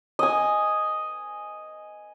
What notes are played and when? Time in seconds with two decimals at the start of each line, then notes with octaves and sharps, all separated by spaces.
0.19 D#5 G#5